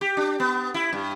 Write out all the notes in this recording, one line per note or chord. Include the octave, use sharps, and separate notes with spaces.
G4
D4
B3
E4
G2